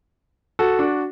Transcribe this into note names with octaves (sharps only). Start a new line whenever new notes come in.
F#4 A4
D4 F#4